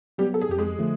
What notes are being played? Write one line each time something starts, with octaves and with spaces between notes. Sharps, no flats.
F#3 G3 B3 G4
A4
G#4
F2 G4
G#3 G#4
D3 F3 A3